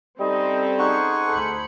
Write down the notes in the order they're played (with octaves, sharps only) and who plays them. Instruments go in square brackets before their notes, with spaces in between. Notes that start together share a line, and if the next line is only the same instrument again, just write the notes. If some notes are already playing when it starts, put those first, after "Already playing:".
[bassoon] G3 [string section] C4 C#4 A4 [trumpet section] D#4 C5 D#5
[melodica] D#4 F#5 C#6 [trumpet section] G#4 C5
[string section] D2 B5 C#7 [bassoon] A4